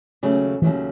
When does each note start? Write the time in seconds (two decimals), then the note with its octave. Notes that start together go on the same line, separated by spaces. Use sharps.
0.23 D#2 C#3 F#3 A3
0.62 D#2 C#3 E3 F#3 A3